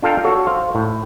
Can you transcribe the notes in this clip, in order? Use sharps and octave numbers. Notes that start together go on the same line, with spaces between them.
D4 F4 A4 F5 G5 A#5
F#4 A4 C#5
C5 F5
A2